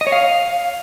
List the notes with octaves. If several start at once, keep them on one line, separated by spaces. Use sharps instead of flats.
D#5
C#5
F5